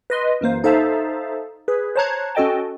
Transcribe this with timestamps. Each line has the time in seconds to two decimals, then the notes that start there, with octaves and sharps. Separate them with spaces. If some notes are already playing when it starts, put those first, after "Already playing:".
0.10 B4 D#5 C6
0.41 F#2 E3 A#3 C5
0.64 D#4 A4 C5 E5 F5 A5
1.68 G#4 B4
1.96 C5 C#5 A5 A#5 F#6 G#6
2.35 C#4 F#4 A4 D#5 G5 A5